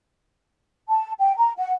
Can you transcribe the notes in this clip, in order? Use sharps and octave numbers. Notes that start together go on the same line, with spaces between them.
A5
G5
A#5
F#5